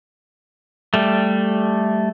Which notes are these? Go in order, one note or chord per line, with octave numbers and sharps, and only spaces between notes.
G3 A3